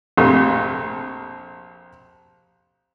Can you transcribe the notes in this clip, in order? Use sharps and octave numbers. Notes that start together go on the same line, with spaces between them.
A#1 F2 C3 A3